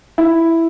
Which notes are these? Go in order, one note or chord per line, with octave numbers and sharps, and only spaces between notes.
E4